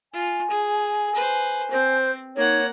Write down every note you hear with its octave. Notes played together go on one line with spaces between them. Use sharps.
F4 G#5
G#4
B4 C5
C4 C5
A#3 D#4 C#5 F#5